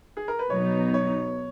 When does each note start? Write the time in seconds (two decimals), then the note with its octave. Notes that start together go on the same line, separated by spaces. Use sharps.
0.17 G#4
0.28 A#4
0.39 B4
0.50 B2 F#3 B3 D#4 C#5
0.94 C#5